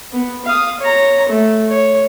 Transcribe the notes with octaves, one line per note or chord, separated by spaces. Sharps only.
B3
F5 D#6
C#5 A#5
A3
C#5